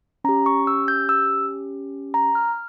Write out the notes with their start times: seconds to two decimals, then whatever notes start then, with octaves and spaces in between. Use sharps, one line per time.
0.24 C#4 A#5
0.29 G4
0.46 C#6
0.67 E6
0.88 G6
1.09 E6
2.14 A#5
2.35 F6